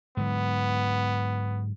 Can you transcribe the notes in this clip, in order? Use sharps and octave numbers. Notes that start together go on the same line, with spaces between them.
G#2 D3 F#3 B3